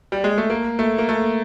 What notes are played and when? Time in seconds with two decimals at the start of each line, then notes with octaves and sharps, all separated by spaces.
0.12 G3
0.24 G#3
0.38 A3
0.50 A#3
0.79 A3
0.98 A#3
1.09 A3